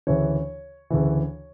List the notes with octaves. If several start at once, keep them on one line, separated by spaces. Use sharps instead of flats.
D2 C#3 E3 C#5
D2 C#3 E3